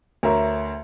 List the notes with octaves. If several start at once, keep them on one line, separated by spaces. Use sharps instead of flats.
D2 A#4 C#5 E5 A#5